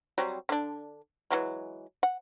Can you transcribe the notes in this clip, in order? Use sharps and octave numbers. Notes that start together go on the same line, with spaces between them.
F#3 G3 C4
D3 D4
E3 F#3 G#3
F#5